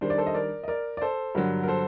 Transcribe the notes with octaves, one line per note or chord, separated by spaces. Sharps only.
D#3 G3 D4 C5
D5
A4 C5
D#5
A#4 D5
D#5
A#4 D5
D5
A4 C5
G2 D3 F#3 A#4
A#4
A4 C5